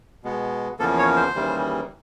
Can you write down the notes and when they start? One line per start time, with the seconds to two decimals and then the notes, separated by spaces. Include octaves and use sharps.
0.23 B2 G#3 B3
0.79 E2 C#3 F3 A#3 A4
0.98 C#5
1.16 C5
1.35 D#2 C#3 E3 G3 A#3